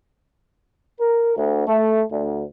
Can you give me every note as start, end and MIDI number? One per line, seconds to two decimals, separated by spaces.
1.00 1.35 70
1.36 1.66 38
1.68 2.04 57
2.11 2.43 38